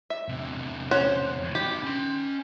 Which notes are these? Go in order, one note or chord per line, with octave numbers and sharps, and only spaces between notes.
E5
E2 C3
C#4 C5 F#5
D#4 F#4 G4
C#4 C6